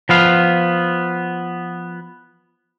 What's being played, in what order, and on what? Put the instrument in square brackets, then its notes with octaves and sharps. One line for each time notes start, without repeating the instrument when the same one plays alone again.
[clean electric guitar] F3 B3 F5